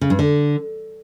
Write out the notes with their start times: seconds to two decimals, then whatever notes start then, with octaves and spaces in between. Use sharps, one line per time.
0.01 C#3
0.10 G2
0.19 D3